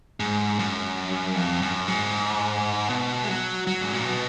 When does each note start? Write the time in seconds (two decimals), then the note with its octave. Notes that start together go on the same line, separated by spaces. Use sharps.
0.20 G#2
0.59 F#2
1.36 F2
1.62 F#2
1.88 G#2
2.90 B2
3.24 G#3
3.29 F#3
3.67 F#3
3.81 G#2
3.93 A#2
4.05 B2